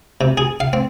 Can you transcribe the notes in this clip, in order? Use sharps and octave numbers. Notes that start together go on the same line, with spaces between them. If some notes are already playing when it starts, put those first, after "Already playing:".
C3
G#4
F5
C4